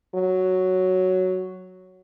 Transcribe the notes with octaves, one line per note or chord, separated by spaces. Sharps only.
F#3